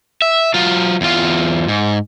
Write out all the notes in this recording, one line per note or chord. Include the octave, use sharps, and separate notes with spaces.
E5
F#3 F4
E2 F4
G#2